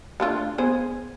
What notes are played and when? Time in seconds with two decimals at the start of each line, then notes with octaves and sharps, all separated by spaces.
0.20 A3 D4 F4
0.58 B3 G#4 C5